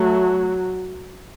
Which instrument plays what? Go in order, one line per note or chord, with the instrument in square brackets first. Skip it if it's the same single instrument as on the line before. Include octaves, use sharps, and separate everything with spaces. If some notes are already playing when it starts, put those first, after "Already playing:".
Already playing: [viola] F#3 [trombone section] A3